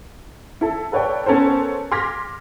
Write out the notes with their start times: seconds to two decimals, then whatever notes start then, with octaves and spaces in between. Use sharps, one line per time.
0.61 E4 A4
0.92 A4 B4 C#5 D5 G5
1.26 B3 C#4 A4 A#4 C5
1.92 C6 D6 F6 G#6 A#6 B6